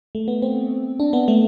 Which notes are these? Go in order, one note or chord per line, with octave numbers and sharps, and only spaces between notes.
A3
B3
C4
D4
B3
A3